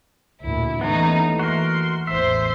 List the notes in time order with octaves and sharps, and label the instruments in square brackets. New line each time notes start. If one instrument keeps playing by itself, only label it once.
[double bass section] D2 A#2 [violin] E4
[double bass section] D#2 E3 A3 [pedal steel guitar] B3 C#4 [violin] D#4
[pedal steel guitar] F#4 A#4 [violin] C6
[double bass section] A1 E2 [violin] C5 C6 [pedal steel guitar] E5